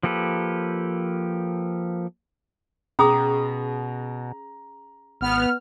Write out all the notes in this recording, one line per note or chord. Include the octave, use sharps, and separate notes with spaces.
F3 A#3 G4 A4 B4
B2 C#4 G#4 A#5 D#6
G#1 B3 F6